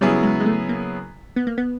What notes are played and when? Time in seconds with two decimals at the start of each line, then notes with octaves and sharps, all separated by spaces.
0.01 C#3 F#3 G3 B3 E4 G#4
0.23 G#3
0.40 G#3
0.46 A3
0.69 A#3
1.36 B3
1.47 A#3
1.58 B3